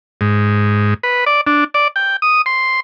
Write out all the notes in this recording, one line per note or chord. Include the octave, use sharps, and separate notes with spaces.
G#2
B4
D5
D4
D5
G5
D#6
C6